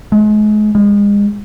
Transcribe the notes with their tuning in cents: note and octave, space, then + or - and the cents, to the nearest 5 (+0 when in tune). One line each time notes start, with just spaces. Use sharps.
G#3 +35
G#3 -35